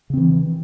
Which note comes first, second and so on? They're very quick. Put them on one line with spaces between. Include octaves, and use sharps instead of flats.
C#3 C4 E3